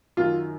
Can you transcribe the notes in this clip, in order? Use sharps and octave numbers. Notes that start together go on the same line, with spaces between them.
F#2 D#3 F#3 F4